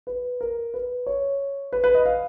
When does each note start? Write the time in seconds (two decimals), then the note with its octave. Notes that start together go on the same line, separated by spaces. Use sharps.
0.07 B4
0.41 A#4
0.74 B4
1.07 C#5
1.73 B4
1.84 B4
1.95 D#5
2.06 F5